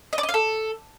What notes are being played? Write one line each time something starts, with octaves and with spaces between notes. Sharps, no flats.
D#5
D5
D#5
F5
A4